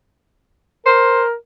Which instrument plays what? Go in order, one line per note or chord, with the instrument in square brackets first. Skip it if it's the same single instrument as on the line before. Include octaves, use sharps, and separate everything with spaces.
[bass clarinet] A#4 [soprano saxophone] C5